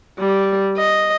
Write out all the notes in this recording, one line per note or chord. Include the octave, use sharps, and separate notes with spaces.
G3
D#5